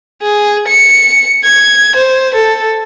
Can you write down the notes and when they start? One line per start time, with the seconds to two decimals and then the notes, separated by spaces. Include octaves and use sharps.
0.22 G#4
0.68 C#7
1.45 G#6
1.96 C5
2.35 A4